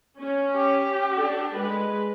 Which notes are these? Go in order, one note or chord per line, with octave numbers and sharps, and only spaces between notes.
C#4
G4
D4 A4
G#3 B4